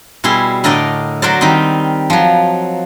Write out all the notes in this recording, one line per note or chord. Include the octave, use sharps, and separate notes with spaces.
B2 G3 E4 G#4 C6
A2 D3 A#4 D5 D#5 G5
F#3 F#4 A#4 C5 D5
D#3 G3 C4 D#4
F3 F#3